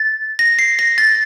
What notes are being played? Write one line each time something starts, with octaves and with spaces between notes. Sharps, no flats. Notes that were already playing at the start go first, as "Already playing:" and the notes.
Already playing: A6
A#6
C7
A#6
A6